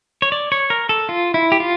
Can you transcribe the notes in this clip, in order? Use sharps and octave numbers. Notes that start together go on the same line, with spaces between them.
C#5
D5
C#5
A#4
A4
F4
E4
G4
F4